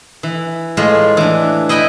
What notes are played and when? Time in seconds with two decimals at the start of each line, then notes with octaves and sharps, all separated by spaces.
0.23 E3
0.77 A2 G#3 F4
1.17 E3 D4
1.69 E4 D#5 F#5 G5 B5